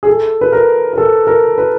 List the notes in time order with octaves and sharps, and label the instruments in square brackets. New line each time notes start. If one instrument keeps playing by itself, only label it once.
[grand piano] G#4
A4
B4
A#4
A#4
A4
A#4
B4